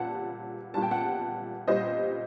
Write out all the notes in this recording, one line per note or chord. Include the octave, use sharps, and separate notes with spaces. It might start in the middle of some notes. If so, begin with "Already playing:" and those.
Already playing: A#2 G3 F#5 A5
A#2 G3 A5
G5
F#5 A5
A#2 G3 C5 D#5